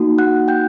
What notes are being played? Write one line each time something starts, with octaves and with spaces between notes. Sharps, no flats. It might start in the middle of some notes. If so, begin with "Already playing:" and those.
Already playing: A#3 D#4 F#4
F#5 F#6
G5 G6